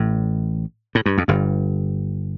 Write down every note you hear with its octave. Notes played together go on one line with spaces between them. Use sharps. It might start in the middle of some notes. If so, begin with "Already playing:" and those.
Already playing: A1 A2
A2
G2
F2
G1 G2